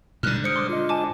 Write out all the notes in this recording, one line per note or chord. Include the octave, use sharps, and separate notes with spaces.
G#2 B2 D3 G3 F6 F#6
C5 D#6 F6 G6 C#7 D7
C6 D6
F4 D#5
G#5 A5 D6